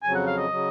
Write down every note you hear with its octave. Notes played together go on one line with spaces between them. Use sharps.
F2 C#3 F#3 G#5
F#5
F5
D#5
C#3 F#3